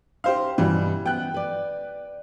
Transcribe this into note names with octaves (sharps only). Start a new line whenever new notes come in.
D#4 G4 C5 F5
G2 B2 E3 G3
B3 G5 F#6
B4 D5